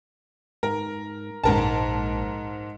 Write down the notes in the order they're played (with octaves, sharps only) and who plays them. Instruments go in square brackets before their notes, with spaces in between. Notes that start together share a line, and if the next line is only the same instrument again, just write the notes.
[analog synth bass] G#2 [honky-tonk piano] A#4
[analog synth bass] A#1 [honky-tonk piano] G#2 A#4 A5